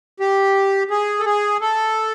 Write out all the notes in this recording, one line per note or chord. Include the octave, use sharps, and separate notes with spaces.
G4
G#4
A4
G#4
A4